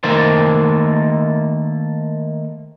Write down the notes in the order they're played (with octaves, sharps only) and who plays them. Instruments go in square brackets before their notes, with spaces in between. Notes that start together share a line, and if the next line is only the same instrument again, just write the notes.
[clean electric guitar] D#3 A3 A#3 A4 C5